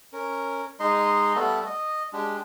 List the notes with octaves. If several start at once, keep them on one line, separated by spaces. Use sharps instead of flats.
C#4 A#4
G#3 D#4 D#5 C6
G3 A3 B3 A4
D#5
G#3 D4 G4